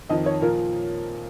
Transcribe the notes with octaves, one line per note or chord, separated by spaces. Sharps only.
F2 D#3 D#5
C#5
A#2 F3 A#4